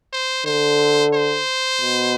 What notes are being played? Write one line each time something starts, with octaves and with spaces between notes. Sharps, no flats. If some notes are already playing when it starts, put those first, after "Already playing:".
C5
D3 C5
C5
B2